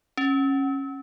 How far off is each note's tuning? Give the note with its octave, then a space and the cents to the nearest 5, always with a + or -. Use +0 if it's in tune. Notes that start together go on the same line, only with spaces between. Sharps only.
C#4 -20